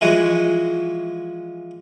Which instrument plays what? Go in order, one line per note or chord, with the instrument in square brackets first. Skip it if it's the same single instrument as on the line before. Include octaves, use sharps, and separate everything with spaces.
[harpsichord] E3 F3 G#3 F#4